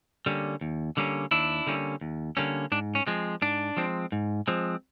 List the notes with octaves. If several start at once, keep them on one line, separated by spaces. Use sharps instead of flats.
D3 G3 A#3 C#4
D#2
D3 G3 A#3 C#4
D#2 D4 E4
D3 G3 A#3 C#4
D#2
D3 G3 A#3 C#4
G#2 D4
C#4
F3 G#3 C4
G#2 D4
F3 G#3 C4
G#2
F3 G#3 C4